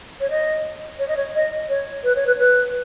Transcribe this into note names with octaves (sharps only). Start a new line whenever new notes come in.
C#5
D#5
C#5
D#5
C#5
D#5
C#5
B4
C#5
B4
B4